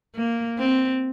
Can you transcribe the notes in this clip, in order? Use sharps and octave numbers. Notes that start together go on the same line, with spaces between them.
A#3
C4